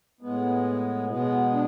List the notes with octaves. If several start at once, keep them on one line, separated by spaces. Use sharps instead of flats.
A2 G#3 B3
B2 G#3 B3
D4